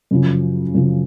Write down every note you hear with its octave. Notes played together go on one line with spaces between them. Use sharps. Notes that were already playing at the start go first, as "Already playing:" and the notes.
F#2 C#3 F3
F#2 C#3 F3